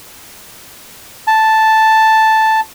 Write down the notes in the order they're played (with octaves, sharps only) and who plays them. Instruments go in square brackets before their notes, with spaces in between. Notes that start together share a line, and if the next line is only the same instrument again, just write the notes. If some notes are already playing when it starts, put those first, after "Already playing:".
[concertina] A5